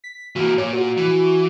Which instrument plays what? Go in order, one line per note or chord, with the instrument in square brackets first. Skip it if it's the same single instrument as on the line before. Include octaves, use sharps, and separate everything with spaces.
[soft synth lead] B6
[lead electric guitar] E3 A#3 [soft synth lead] F#4
[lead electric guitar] A#2 [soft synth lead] C#5
[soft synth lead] F#4
[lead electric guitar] E3